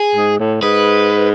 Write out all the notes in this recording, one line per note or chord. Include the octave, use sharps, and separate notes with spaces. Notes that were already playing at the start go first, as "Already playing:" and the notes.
Already playing: G#4
G#2
A2
G#2 B4